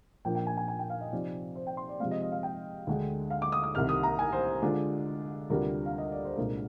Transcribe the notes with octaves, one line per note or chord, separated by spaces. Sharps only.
A#2 F3 A#3 D4 G5
G5
G#5
G#5
G#5
G5
F5
D#5
C3 F3 C4 D#4 D5
C5
G5
C6
D5
C3 F3 G#3 C4 F5
D#5
D#5
F5
G5
D2 D3 G#3
F5
D6
D#6
D#6
C2 C3 D#3 F6
D#6
A#5
G#5
C5
D3 G#3 D4 F4
D2 C3 G3 D4 F4 A#4
F5
D#5
D5
C5
C2 A#2 G#3 D4 A#4